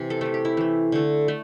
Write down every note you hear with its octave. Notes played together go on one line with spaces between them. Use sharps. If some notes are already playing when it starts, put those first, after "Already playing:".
Already playing: C3 E3
A4
E3 A3 A4
G4
E4
E3 A3
D3 A3
A3